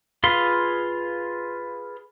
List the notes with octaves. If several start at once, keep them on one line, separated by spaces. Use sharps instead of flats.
F4 G#4 B4 F5 C6